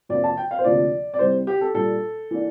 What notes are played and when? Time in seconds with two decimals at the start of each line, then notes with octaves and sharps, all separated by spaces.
0.09 F2 C3 F3 A#3 D4 D5
0.24 A5
0.37 G5
0.51 F5
0.58 C5
0.64 D2 C3 F3 A#3 D4 D5
1.14 D5
1.19 C2 C3 G3 C5
1.47 G4
1.61 A4
1.74 A#2 G3 D4 A4
2.31 E3 A#3 D4